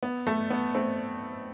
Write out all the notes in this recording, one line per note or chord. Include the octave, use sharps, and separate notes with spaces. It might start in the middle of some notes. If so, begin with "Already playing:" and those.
B3
A3
B3
A3 C4